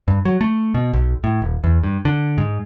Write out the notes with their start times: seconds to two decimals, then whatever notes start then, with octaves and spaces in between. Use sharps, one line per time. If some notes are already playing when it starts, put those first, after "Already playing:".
0.08 G2
0.25 F#3
0.41 A3
0.74 B2
0.93 B1
1.24 A2
1.42 D#1
1.64 E2
1.83 G2
2.05 D3
2.38 G#2